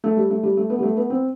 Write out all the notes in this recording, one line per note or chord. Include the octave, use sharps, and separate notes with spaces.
A3
G3
A3
G3
A3
B3
G3
A3
B3
C4